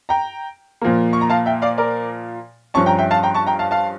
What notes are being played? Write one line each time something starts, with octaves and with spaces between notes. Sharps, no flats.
G5 A#5
A#2 F3 A#3
C#6
A#5
F5 A5
E5 G5
D5 F5
A#4 D5
G2 F3 C#4 A5 C#6
G5 A#5
E5 G5
F5 A5
G5 A#5
A5 C#6
G5 A#5
F5 A5
F5 A5